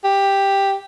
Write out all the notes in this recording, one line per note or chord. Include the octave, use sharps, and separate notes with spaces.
G4